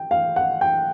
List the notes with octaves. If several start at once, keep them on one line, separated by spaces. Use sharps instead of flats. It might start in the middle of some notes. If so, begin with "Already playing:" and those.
Already playing: G5
F5
F#5
G5